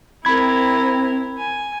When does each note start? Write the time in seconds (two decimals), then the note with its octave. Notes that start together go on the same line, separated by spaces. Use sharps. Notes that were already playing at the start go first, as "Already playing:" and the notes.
0.25 C4 E4 A#4 B5 G#6
1.37 G#5